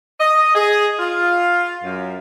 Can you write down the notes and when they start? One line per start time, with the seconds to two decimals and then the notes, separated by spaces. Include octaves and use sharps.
0.20 D#5
0.55 G#4
0.99 F4
1.84 F#2